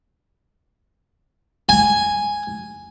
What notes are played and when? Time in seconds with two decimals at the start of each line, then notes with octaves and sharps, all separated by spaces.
1.69 G#5